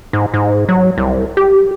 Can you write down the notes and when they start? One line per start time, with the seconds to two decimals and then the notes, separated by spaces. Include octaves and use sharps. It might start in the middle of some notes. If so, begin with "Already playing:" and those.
0.13 G#2
0.34 G#2
0.69 F#3
0.98 C2
1.37 G4